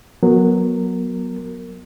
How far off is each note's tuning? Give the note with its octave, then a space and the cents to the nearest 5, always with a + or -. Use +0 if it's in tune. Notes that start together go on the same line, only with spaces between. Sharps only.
F#3 -5 B3 -25 A#4 -20